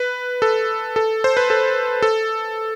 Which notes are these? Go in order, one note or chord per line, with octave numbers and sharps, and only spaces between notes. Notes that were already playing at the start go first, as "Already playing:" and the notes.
Already playing: B4
A4
A4
C5
B4
A4
A4